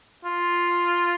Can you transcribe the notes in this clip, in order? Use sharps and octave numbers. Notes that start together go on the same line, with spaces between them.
F4